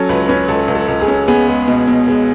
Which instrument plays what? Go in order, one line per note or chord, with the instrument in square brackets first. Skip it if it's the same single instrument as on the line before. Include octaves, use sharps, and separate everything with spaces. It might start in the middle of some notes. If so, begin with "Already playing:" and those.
Already playing: [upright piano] F#3 C#4 A4
C#2 B4
C#4 B4
C#2 A4
C#2
A4
C#2
G#4
C#4
B3 G#4
G#3
B2
B2
G#3